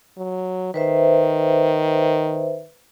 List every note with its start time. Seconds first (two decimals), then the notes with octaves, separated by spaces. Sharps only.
0.17 F#3
0.74 D#3 B4 C5 E5